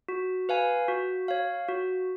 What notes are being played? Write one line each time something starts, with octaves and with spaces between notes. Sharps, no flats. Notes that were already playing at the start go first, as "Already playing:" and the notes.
F#4
B4 F5 G#5
F#4
C#5 F5
F#4